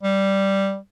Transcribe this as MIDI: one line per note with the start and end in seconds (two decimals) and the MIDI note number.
0.03 0.77 55